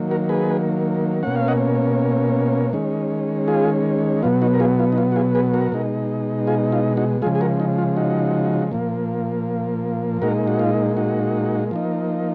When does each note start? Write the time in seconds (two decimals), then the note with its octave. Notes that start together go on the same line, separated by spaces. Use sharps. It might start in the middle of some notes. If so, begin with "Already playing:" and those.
Already playing: D#3 F#3 A#3
0.11 F#4 A#4
0.29 G#4 B4
1.23 B2 A#3 C#4 F#5
1.36 F5
1.48 D#5 F#5
2.73 D#3 G#3 C#4
3.48 F4 G#4
4.23 B2 F#3 B3 F4
4.42 D#4 F#4
4.54 A#4
4.60 F4 G#4
4.79 F4
4.92 D#4
4.98 F4
5.12 F#4
5.16 F4 G#4
5.35 G#4 B4
5.54 F#4 A#4
5.72 B2 G#3 D#4
6.47 F4 G#4
6.72 F4
6.97 D#4 F#4
7.22 C#3 F3 G#3 F4 G#4
7.35 G#4
7.41 F#4 A#4
7.60 D#4
7.78 F4
7.97 D#4 F#4
8.72 A#2 F3 A#3
10.22 A#2 G#3 D#4 F#4 A#4
10.47 F#4
10.59 F4
10.97 D#4 F#4
11.71 F3 A#3 D#4